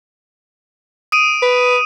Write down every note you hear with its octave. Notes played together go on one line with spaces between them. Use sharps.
D#6 D7 D#7
B4